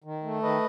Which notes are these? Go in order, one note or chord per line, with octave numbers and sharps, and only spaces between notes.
D#3
A3
D#3 B4 D#5